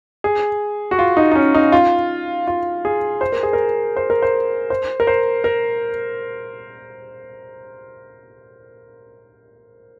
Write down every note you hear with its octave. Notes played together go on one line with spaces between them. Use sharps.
G#4
F#4
F4
D#4
D#4
C#4
D#4
F4
F4
G#4
C5
A#4
G#4
A#4
C5
A#4
C5
C5
A#4
C5
A#4